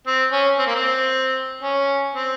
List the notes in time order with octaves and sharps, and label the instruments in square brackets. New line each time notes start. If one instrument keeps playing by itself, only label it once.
[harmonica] C4
C#4
C4
A#3
C4
C#4
C4